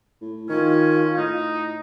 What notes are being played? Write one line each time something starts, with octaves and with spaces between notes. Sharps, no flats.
A2
D#3 C#4 F4
A2 D#4